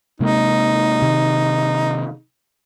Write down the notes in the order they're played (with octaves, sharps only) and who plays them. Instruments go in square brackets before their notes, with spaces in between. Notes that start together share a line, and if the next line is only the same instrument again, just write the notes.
[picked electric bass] C3 G#3 A#3 [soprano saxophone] D#4
[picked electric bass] C3 D#3